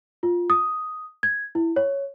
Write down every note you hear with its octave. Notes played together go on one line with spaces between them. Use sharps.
F4
D#6
G#6
E4
C#5